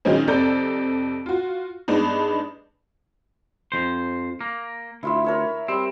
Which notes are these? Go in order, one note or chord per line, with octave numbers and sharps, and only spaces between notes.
A#2 D#3 F#3 G#3 C#4 D#4
F2 C3 A4 D5 A#5 G6
F4 F#4
G2 G#3 B3 D4 D#4
F2 C5
A#3
D2 E4 F4 E5
A#4 C#5 E5
G3 C4